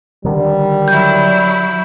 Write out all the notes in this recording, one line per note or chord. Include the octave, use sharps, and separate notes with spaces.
D3 D#3 G3
F#3 E4 G6